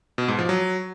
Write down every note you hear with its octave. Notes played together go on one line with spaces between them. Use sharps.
B2
G#2
F3
F#3